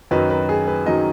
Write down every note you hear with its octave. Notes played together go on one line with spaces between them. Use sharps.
F#2 D#3 F#3 D#4 B4
B4
G#4
B4
F#2 D#3 F#3 D#4 D#5